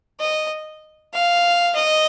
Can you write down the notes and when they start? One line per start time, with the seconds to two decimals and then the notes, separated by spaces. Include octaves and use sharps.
0.21 D#5
1.14 F5
1.76 D#5